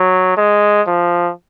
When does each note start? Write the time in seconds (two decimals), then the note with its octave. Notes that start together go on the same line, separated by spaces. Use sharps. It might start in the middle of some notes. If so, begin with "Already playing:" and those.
Already playing: F#3
0.37 G#3
0.87 F3